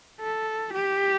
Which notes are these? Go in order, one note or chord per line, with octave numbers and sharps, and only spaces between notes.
A4
G4